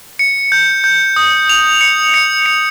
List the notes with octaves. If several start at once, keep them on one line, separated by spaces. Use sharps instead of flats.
C#7
G6
G6
D#6
F7
C#7
C#7
C#7